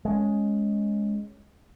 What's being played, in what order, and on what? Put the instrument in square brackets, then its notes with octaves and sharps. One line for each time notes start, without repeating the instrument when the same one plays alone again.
[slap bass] G#3 C#4